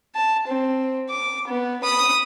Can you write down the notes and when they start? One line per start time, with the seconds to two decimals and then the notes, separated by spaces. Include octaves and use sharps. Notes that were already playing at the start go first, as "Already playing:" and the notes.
0.15 A5
0.47 C4
1.10 D6
1.47 B3
1.84 B5 D#6